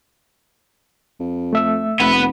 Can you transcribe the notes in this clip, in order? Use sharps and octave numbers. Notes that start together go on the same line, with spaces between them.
F2
A3 E5 E6
F1 B3 B4